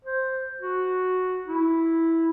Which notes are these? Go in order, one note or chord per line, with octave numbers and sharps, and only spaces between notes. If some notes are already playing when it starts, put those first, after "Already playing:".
C5
F#4
E4